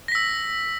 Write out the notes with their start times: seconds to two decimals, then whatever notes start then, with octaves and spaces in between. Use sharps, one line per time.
0.08 A#6
0.12 B6
0.15 E6